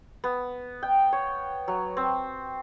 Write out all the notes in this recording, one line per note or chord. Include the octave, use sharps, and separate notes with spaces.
B3
G5
C#5
F#3
C4